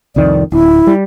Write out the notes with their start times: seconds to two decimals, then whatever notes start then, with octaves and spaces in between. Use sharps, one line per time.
0.16 C2 F2 D#3 D5
0.52 D1 E4
0.87 G3